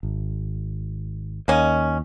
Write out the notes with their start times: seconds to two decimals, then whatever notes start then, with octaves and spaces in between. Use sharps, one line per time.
0.03 G#1
1.48 D#2 A#3 C#4 D#5